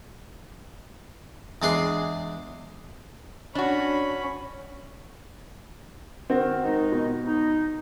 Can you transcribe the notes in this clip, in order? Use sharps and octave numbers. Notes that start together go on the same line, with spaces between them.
E2 G#3 D4 G#4 C6
C#4 D4 F#4 B5
D#3 C4 F#4
D#3 G#3 D#4
B2
D#4